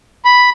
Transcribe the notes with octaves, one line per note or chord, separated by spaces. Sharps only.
B5